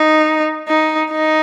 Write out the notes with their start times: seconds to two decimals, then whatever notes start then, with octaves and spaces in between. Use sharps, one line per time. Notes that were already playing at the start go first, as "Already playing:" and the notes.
Already playing: D#4
0.68 D#4
1.11 D#4